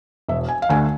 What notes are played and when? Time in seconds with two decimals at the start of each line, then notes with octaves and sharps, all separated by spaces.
0.29 E1 E5
0.49 G#5
0.62 F5
0.69 D2 D3 A3 G#5